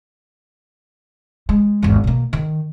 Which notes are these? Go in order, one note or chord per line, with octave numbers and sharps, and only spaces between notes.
G#3
G#1 E2
B2 A#3
D#3